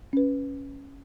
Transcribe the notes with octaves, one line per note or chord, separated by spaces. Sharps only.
C#4 B4